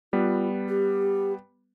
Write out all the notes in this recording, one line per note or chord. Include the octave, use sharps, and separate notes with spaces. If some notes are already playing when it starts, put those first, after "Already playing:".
G3 B3 F4 B4
G4